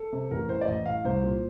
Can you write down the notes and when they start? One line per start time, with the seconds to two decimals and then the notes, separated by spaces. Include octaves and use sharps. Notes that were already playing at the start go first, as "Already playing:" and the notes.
Already playing: A4
0.13 C3
0.31 A1 A#4
0.48 A2 C5
0.61 D5
0.68 A1 D#5
0.86 A2 F5
1.05 C2 C5
1.23 A#2